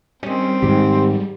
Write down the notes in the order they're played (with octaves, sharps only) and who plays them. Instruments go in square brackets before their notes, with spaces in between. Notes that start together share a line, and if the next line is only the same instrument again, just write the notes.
[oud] D#3 C#4 [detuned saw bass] G3 [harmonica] C4
[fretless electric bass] G#2 D#3 [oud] G4